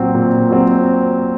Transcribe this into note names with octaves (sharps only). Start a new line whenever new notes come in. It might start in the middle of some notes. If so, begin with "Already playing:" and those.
Already playing: A#2 F#3 C4
A#2
F#3 C4